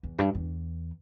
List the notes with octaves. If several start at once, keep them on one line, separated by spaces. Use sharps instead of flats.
E2
G2
E2